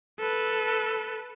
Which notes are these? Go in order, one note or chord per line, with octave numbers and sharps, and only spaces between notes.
A4 B4